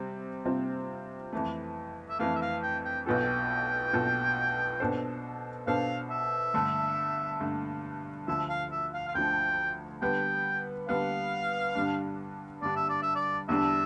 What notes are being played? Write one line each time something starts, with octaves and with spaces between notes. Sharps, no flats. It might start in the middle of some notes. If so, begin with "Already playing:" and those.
Already playing: C3 G3 C4
C3 G3 C4 F4
F2 E3 A3
E5
F2 E3 A3 F5
E5
F5
G5
G5
B1 B2 B3 F4 A4 G5
B1 B2 B3 F4 A4
B2 B3 D4 A4 C5
B2 B3 D4 A4 C5 F5
E5
G2 D3 A3
G2 D3 A3
D2 D3 F3 E5
F5
E5
F5
F5
D2 D3 F3 G5
D3 G3 B3 G5
D3 G3 B3 F5
G2 D3 G3 D4
G2 D3 G3 D4 D5
E5
D5
E5
D5
E2 D3 G3 D4 E5